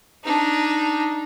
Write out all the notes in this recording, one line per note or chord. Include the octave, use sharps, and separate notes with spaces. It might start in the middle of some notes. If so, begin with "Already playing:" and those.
D4 D#4